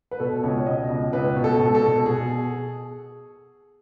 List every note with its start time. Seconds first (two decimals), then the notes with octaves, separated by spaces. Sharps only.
0.11 B4
0.20 B2 A4
0.43 C#2 C#5
0.66 B2 D#5
0.90 C#2
1.13 C#2 B4
1.36 B2
1.44 A4
1.59 B2
1.75 A4
1.83 B2
2.06 B2 G#4
2.29 B2